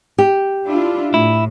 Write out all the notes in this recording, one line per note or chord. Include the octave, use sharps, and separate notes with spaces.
G4
D4 E4 F4
A2 E4